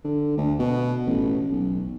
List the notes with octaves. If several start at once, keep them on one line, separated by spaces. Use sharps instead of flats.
D3
D2
B2
A1
B1